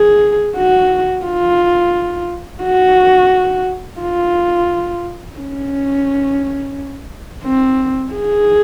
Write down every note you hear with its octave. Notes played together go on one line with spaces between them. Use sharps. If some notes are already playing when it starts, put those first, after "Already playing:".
Already playing: G#4
F#4
F4
F#4
F4
C#4
C4
G#4